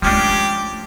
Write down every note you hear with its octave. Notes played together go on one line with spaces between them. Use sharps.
F3 G#3 A3 C#4 D4 G4